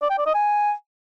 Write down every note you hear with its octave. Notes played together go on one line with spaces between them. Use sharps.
D5
G5
D5
D#5
G#5